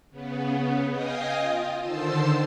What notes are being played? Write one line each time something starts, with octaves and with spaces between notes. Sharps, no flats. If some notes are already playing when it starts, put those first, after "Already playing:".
C#3 B3
D#5 F5 G5 G#5 D#6
F4
D3 D#3 C5 A5 C6 E6